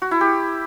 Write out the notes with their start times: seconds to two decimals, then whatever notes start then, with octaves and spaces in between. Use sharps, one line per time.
0.02 F#4
0.11 E4
0.21 G4